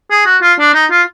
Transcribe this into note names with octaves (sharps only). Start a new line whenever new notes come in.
G#4
F#4
F4
D4
D#4
F4